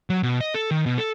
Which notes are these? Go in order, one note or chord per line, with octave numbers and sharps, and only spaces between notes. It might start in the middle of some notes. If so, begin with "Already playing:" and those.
F#3
B2
D#5
A4
D#3
B2
A4